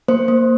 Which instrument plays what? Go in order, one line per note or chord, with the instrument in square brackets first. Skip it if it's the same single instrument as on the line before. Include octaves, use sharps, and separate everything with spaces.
[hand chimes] A#3 C5
A#3